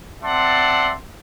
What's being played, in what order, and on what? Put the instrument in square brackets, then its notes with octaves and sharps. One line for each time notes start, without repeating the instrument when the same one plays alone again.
[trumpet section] C4 D5 E5 F#5 A5 C6